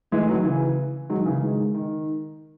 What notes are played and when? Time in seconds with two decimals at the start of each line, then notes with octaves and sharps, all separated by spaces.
0.12 E3 G#3 A3
0.29 D#3 F#3
0.45 C#3 E3
1.10 D#3 F#3 G#3
1.26 C#3 E3
1.42 D#3 G#3
1.75 D#3